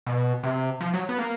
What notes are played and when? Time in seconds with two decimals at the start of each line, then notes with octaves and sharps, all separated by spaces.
0.07 B2
0.43 C3
0.81 F3
0.94 F#3
1.09 B3
1.19 A#3